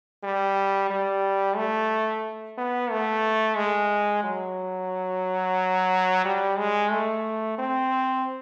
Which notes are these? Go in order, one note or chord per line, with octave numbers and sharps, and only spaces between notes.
G3
G3
A3
B3
A3
G#3
F#3
G3
G#3
A3
C4